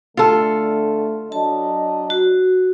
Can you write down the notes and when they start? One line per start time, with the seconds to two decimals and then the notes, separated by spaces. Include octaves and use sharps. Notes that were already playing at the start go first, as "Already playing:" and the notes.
0.17 D3 A3 F4 A4
1.32 F#3 D4 D#5 A5
2.10 F#4